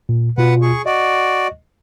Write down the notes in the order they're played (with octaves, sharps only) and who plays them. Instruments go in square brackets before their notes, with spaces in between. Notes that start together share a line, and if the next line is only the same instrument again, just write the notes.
[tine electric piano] A#2
[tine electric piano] B2 F4 [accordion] B4 F#5
[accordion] G#4 C#6
[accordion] F#4 D5 [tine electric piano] D#5